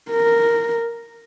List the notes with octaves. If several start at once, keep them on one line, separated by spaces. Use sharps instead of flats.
A#4